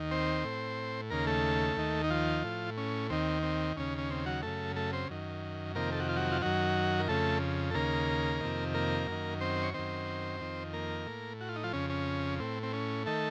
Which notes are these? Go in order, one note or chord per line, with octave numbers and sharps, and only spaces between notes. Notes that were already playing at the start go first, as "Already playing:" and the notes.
Already playing: D#2 D#3
C4 C5
A2
D#2 C#3 A#3 A#4
A3 A4
D#2 D#3
D#4
F3 F4
A2
C#4
D#2 D#3 C4
C4
D#2 C#3 C#4
C#4
C4
F#3 F#4
F#2 C#3 A3 A4
A3 A4
C4 C5
F#2 D#3
F2 C3 D#3 A#3 A#4
A4
F#4
F4
F#3 F#4
F4
F#2 D#3 F#3 F#4
A#4
F2 C#3 A3 A4
A4
D#2 C#3 A#3 A#4
F2 C3 D#3
A#3 A#4
F#2 D#3
C4 C5
C#5
F#2 D#3 C4 C5
F2 D#3
A#3 A#4
A2
F#4
F4
D#4
F3 F4
F2 C#3 C#4
C#4
A2 C4
C4
C#4
D#3 A3 A4